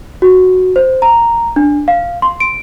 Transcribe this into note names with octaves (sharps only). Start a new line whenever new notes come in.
F#4
C5
A#5
D4
F5
C6
D7